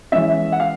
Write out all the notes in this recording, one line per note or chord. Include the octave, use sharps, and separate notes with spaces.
E3 G#3 C#4 E5
F#5
F5